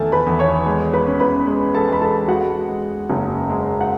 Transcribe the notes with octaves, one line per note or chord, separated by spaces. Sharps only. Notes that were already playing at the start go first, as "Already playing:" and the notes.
Already playing: E2 D#3 A3 A4 G#5 A5
B4 B5
E2
C#5 C#6
G#3
B4 B5
C#4
B4 B5
G#3
A4 A5
G#3 B5
A4 A5
G#3 F#4 F#5
G#3
F#1
G#3
F#5